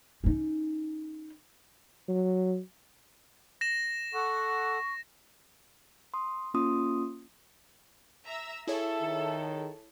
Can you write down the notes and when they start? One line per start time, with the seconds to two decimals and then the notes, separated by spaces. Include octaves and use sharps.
0.24 C#4 D#4
2.08 F#3
3.61 A#6 E7
4.14 A4 F#5 C#6
6.14 C6 D#6
6.54 A#3 C#4 F4 C6 D#6
8.25 E5 A#5 E6
8.67 E4 G#4 A4 C#5 E5
9.02 D#3